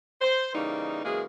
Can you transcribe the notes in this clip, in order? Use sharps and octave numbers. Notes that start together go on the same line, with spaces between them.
C5
C#3 E3 G3 A#3 D#4
F#2 C#3 E3 G#3 A#3 G#4